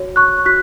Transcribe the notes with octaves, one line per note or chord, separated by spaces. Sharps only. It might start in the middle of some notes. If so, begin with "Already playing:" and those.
Already playing: F#4 C#5
C#6 F#6
F#4 F#6 B6